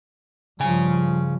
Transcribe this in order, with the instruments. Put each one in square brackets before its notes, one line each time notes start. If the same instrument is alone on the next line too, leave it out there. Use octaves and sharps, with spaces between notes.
[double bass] G2 F3 [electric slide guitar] C#3 G#5